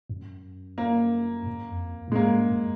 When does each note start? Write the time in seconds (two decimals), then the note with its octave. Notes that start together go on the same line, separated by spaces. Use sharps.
0.09 F#2
0.78 A#3
1.47 F#2
1.70 F2
2.08 A#2
2.12 G#3
2.15 G#2 A#3
2.51 F#2